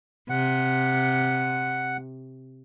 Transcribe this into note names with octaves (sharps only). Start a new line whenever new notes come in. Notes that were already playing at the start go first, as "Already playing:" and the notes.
C3 F#5